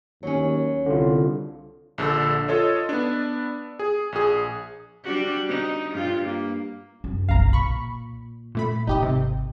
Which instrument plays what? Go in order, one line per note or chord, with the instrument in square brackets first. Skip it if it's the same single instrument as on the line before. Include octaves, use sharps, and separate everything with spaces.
[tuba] D#2 [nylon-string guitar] F#3 C#4
[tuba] C2 [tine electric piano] D3 F4
[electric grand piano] A#1 D3 A4 E6
F4 A4 C#5 D#5
B3 D4
G#4
A#1 G#4
[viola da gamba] G3 D4 F#4
D#4
G2 F4
A#3
[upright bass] F#2
[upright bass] F#1 B1 [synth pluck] F5 A#5
[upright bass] A#2 [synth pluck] B5 C#6
[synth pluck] A#2 A3 B5
[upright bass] G#1 [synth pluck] D#4 G4 D#5
[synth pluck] C3